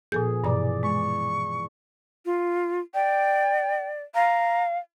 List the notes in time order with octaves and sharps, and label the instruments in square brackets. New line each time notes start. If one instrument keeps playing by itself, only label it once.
[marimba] A#2 A4 G6 [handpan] F3 B3 G#4
[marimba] G2 B2 A#5 [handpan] E3 D5
[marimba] G#3 [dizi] C#6
[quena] F4
[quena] D5 [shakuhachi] G5
[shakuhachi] F5 [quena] A#5